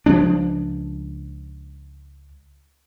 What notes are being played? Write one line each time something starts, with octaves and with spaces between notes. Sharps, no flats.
C#2 F3 G#3 D4